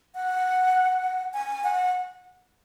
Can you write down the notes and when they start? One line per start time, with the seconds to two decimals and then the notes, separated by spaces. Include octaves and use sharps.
0.15 F#5
1.34 G#5
1.64 F#5